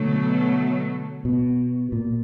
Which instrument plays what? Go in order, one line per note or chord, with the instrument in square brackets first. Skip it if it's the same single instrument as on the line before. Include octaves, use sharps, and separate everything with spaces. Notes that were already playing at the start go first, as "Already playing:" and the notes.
Already playing: [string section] B2 F#3 A3 [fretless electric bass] D3
[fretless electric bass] B2
A#2